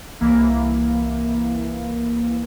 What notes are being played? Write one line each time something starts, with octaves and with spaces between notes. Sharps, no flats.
C2 E3 A#3 E4